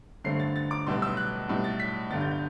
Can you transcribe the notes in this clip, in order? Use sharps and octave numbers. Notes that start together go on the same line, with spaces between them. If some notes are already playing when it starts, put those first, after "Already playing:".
G2 D3 A3 C4 C7
A6
A6
D6
B1 A2 G3 B3 C6
E6
F#6
B1 A2 G3
A6
B6
G1 G2 D3 A6
G6
G6